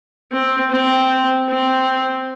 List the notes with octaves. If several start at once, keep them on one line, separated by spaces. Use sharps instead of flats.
C4
C4
C4